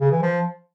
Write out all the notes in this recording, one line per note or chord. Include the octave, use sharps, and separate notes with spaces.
C#3
E3
F3